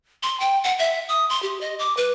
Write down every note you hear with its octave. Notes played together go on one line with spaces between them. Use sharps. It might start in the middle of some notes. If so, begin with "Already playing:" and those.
C6
G5
F#5
E5
D#6
C6
G4
D#5
D6
B4